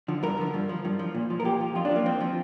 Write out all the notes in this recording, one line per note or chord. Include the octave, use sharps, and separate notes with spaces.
D3 F3
G2 A#4
D3 F3
G2
F3
G2
F3
A#2
F3
A#4
A#2 G4
F3
F2 F4
D4
F3 A#3
F2 C4
F3